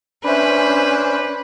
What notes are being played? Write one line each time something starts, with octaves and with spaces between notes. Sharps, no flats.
C#4 D4 B4 C5 E5 B5